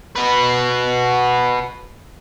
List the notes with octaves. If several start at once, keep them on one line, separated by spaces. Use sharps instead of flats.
F#4 B4